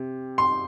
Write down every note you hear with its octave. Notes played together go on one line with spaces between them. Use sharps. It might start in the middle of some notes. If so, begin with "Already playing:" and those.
Already playing: C3
C6